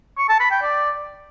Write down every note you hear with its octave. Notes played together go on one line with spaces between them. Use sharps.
C#6
A5
B5
G5
D5